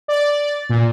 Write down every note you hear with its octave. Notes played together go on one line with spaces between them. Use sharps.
D5
A#2